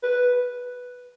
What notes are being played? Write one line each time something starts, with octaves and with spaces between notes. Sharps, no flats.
B4